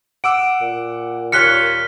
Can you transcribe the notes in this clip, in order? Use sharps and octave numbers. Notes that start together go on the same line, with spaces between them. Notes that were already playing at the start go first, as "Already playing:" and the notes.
F#5 D6 E6 D7
A#2
D#2 F4 C#5 F6 F#6 B6 C#7 G7